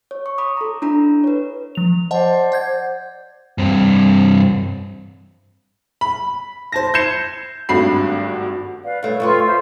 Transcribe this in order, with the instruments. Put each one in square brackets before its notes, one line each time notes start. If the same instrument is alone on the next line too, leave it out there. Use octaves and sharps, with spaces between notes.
[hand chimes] C#5
C#6
B5 D6 D#6
A4 A#5
D4 E4 A#5 B5
B4 C#5
[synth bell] F3 F7
[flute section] C5 D5 [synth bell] D#5 F#5 A5
[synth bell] F#5 G6 G#6
[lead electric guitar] G2 C4
[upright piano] B5
C5 A5 A#6
G6 G#6 C7 C#7 E7
G#1 G2 A3 F#4 B5 C7
[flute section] B4 D5 F5
[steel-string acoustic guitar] G2 A3 [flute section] C#5
[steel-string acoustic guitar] F2 A3 B4 [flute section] F4 C#6
[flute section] C5 E5 F5